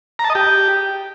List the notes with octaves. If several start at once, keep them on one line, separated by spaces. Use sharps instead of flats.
A#5
A5
D#5
G4